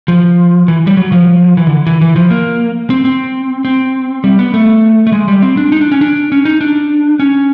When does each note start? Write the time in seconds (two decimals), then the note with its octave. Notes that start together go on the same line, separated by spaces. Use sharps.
0.08 F3
0.68 E3
0.87 G3
0.97 F#3
1.12 F3
1.57 E3
1.67 D3
1.87 E3
2.01 E3
2.16 F3
2.30 A#3
2.90 C4
3.05 C4
3.65 C4
4.24 G3
4.39 B3
4.54 A3
5.07 A3
5.13 G#3
5.28 G3
5.42 C4
5.57 D4
5.72 D#4
5.81 D4
5.92 C#4
6.01 D4
6.32 C#4
6.45 D#4
6.61 D4
7.20 C#4